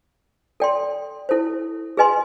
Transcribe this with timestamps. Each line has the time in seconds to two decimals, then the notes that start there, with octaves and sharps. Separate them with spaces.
0.60 A4 D5 G5 C6
1.29 E4 A4 C5
1.97 G#4 B4 D#5 G#5 C6